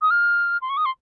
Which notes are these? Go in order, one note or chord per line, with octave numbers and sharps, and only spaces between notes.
D#6
F6
C6
C#6
D#6
C6